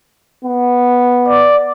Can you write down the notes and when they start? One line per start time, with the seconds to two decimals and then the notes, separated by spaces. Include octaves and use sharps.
0.45 B3
1.29 D5